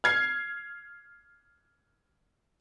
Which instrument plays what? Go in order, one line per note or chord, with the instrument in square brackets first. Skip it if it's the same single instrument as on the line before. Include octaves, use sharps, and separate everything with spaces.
[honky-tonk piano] F6 G#6 C7